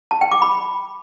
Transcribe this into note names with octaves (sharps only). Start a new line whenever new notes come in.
A5
G5
D6
B5